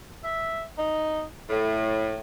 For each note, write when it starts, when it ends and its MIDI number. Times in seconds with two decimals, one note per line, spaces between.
0.24 0.64 76
0.77 1.24 63
1.50 2.18 45